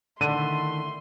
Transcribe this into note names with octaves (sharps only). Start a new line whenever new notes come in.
D3 D#3 A3 E4 C6 D#7